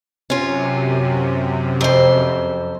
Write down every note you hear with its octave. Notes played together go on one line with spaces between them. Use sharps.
F#2 C3 C#4 F4
F2 C5